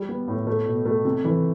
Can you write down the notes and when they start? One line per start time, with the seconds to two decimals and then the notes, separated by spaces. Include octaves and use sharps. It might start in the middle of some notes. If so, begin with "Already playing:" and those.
Already playing: G3
0.09 B3
0.28 A2
0.47 A3
0.66 B2
0.86 A3
1.05 C3
1.25 E3